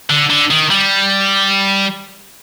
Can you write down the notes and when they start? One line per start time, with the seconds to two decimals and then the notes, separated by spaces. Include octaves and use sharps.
0.10 D3
0.30 D3
0.51 D#3
0.70 G3